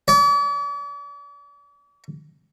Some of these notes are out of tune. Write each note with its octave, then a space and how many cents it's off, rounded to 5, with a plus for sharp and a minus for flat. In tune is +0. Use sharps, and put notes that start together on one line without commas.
D5 -45